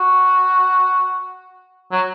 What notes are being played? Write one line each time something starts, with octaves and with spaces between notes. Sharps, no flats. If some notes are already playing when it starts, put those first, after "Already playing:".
Already playing: F#4
F#3